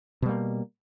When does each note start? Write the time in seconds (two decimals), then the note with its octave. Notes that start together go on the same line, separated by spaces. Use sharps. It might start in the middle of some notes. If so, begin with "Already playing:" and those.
0.22 B2
0.26 G3
0.29 A#3